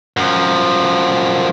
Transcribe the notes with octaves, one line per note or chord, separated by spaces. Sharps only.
F#2 F3